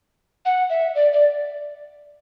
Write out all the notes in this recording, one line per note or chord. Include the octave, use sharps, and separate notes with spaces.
F#5
E5
D5
D5